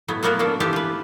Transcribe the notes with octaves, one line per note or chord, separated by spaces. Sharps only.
A2 F#3 B3
F#3 A#3 B3 F#4 A#4
A#3 D4 A4
E3 B3 C4 G4 A5
F4 B4